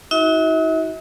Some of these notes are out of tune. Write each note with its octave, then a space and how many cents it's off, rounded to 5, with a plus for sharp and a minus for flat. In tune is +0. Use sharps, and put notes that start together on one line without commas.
D#4 +45 F#4 +0 E5 -40